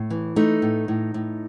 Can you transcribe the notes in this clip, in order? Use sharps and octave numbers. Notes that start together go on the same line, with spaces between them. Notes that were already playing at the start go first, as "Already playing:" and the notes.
Already playing: A2
E3
A3 D#4
A2
A2
A2